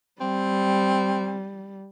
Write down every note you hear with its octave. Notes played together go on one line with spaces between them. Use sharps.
G3 C4